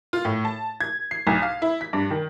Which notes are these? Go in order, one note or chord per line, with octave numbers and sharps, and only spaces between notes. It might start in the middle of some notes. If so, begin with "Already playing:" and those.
F4
A2
A5
G#6
C7
B1
F5
E4
B6
G2
D#3